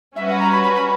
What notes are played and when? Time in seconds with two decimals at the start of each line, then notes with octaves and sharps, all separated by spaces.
0.16 G3 C#4 F#4 B4 E5
0.28 F#5
0.39 A#5
0.51 B5
0.63 B5
0.74 B5